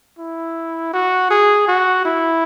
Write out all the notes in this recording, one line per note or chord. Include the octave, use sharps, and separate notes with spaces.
E4
F#4
G#4
F#4
E4